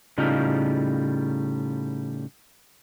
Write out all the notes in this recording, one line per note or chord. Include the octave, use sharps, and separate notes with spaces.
A2 C#3 G3 D#4 F4